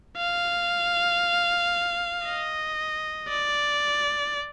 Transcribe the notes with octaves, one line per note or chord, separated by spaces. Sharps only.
F5
D#5
D5